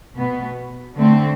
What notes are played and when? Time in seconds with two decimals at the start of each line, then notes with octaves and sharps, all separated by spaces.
0.15 B2 B3
0.96 D3 A3 C4